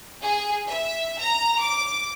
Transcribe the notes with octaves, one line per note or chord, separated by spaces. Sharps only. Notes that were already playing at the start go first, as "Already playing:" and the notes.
G#4
E5
A#5
D6